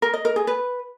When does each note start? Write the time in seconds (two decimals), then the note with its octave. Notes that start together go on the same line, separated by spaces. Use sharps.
0.02 A#4
0.14 D#5
0.25 A#4
0.36 G#4
0.47 B4